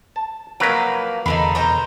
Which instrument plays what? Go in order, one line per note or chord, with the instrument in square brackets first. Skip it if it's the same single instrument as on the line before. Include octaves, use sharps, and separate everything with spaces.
[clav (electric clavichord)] A5
[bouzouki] F3 A#3 [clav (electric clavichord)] F#3 A#4 B4
[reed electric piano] E2 B5 [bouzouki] D3 D#3 D#4
[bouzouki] B2 C5 A#5